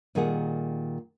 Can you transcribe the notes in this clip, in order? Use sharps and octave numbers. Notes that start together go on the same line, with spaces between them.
A#2 D#3 G3 G#4 F#5